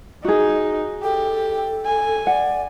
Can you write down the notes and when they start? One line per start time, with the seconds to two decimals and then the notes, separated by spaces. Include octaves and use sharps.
0.25 D#4 F#4 G#4
1.03 G4 A4
1.86 G#5
2.27 D5 F#5